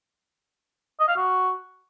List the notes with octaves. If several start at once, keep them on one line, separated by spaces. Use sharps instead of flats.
D#5
F5
F#4